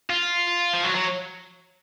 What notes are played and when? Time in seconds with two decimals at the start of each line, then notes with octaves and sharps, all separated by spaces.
0.10 F4
0.74 F3
0.84 F#3
0.95 F#3